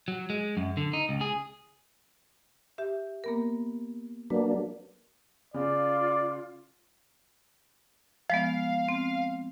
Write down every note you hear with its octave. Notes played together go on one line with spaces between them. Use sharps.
F#3
G#3
F#2
D3
D#4
C#2
G#4
G4 E5
A#3 B3 A#4
F#3 A#3 D4 B4
C#3 F4 D5
F3 G#3 B3 F5
C4